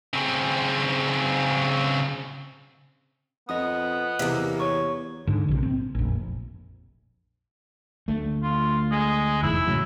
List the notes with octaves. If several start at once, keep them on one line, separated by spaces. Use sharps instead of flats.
C#3 C4
F2 B3 D#5 D#6
E2 C3 A#3
C#5 C#6
G#2 D3
A#1 C3
C4
F1 A#1
D2 A3
F4
G#3
F1 E2 G#2 E4
A2 C#3 F#3